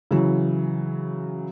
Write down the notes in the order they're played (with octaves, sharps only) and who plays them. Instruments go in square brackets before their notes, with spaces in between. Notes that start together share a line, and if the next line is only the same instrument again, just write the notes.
[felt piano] C#3 E3 F#3